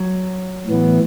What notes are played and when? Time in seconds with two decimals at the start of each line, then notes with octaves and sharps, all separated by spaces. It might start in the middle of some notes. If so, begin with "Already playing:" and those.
Already playing: F#3
0.66 A2 E3 B3